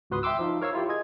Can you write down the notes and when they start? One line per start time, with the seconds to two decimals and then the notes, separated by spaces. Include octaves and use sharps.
0.10 G#1 C#2 F#4 B4 C6 D#6
0.23 E5 G5 C6 D6 E6
0.39 F3 D#4 F5
0.61 A#4 C#5 F5 E6
0.73 E4 F4 G4
0.89 G#4 D#5 G#6